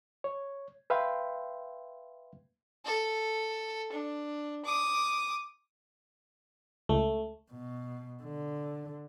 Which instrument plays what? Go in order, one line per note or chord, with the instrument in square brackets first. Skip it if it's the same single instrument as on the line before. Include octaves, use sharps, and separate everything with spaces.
[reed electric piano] C#5
B4 E5 F5 G5 B5 C6
[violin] A4
D4
D6 D#6
[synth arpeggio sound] C#2 [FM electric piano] A3
[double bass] B2
D3